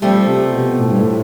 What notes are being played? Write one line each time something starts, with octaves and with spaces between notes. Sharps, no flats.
F3 G3 A3 C4
C3
B2
A2
G2
A2